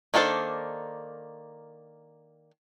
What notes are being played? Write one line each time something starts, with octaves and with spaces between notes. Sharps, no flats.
D#3 A#3 D4 A4 C5